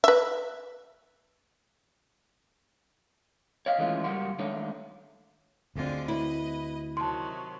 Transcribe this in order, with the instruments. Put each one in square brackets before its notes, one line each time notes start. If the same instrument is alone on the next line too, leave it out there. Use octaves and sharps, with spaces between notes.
[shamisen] B4 E5
[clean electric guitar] C#5 D#5 F5
D#3 E3 G#3 A3 C#4 F4
C#2 F#2 G3 A#3 F#4 C6
D#3 G#3 A3 D4 D#4 C#5
[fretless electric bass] D2 A3 C4 [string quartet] D3 G#3 F4
[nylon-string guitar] E4 [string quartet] B4 D#5
[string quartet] C3 D#3 F#3 [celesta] A5 C6